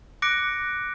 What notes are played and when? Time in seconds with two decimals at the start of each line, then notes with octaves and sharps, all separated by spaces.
0.22 D6 F#6 A#6 C#7 D7